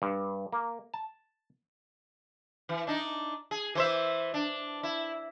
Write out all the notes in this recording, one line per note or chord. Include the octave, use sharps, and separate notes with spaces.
G2
A#3
A5
E3
D4 D#4
G#4
E3 C5 E5
D4
E4